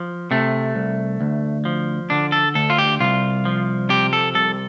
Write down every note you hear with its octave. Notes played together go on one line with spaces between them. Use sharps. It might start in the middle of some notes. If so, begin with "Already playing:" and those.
Already playing: F3
C3 A3
C2
D2
F3
D3 D4
A4
D2 A4
F4
G4
C2 F4
F3
C3 G4
A4
C2 A4